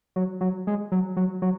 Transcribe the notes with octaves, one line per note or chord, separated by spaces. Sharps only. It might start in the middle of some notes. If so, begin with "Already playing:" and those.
F#3
F#3
G#3
F#3
F#3
F#3